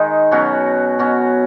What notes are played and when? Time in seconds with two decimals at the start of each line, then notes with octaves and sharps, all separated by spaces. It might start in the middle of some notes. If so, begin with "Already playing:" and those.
Already playing: D#3 G#3 D#4
0.32 B2 F#3 C#4 F#4
0.99 B2 F#3 C#4 F#4